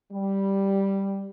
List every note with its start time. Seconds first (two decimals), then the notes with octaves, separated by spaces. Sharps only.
0.12 G3